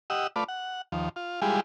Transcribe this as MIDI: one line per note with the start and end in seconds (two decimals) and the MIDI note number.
0.10 0.27 67
0.10 0.27 75
0.10 0.27 78
0.10 0.27 88
0.36 0.44 57
0.36 0.44 65
0.36 0.44 71
0.36 0.44 74
0.48 0.82 78
0.92 1.09 39
0.92 1.09 53
1.16 1.41 65
1.42 1.60 55
1.42 1.60 56
1.42 1.60 64
1.42 1.60 65
1.42 1.60 67
1.42 1.60 68